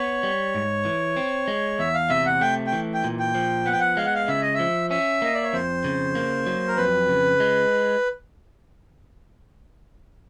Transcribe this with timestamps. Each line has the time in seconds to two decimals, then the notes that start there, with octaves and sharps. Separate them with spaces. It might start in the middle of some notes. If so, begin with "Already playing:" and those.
Already playing: B3 C#5
0.23 G3
0.55 G#2
0.85 E3
1.16 C4
1.48 G#3
1.79 E2 E5
1.94 F5
2.09 C3 E5
2.26 F#5
2.41 A3 G5
2.67 G5
2.72 E3
2.94 G5
3.04 A#2
3.19 G5
3.35 F3
3.66 B3 F#5
3.73 G5
3.80 F#5
3.97 G#3 F5
4.05 F#5
4.15 F5
4.28 C#3 E5
4.42 D#5
4.54 F3 E5
4.90 C#4 E5
5.22 A#3 D#5
5.34 D5
5.43 C#5
5.53 F2 C5
5.84 C#3
6.15 A#3
6.46 F#3
6.68 A#4
6.77 F2 B4
7.09 C#3
7.40 G#3